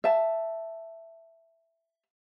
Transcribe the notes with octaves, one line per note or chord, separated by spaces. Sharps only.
E5 A5